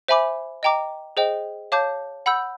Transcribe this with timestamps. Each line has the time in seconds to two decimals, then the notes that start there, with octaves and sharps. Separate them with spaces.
0.08 C5 E5 G#5 B5 D6
0.63 D#5 G5 A#5 D6
1.17 G#4 C5 D#5 G5
1.72 C#5 F5 A5 D6 G6
2.26 F#5 B5 E6 G6